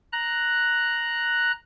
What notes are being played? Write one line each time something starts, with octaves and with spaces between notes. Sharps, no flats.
A#5 F#6